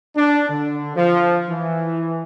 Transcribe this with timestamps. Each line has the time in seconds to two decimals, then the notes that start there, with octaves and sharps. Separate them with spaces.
0.17 D4
0.49 D3
0.96 F3
1.49 E3